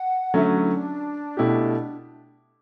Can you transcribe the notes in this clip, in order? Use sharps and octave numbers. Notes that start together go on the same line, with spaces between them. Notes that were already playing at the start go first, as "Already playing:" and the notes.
Already playing: F#5
D3 F#3 A3 C#4 E5
F#4
E4
D4
B2 A3 E4 G4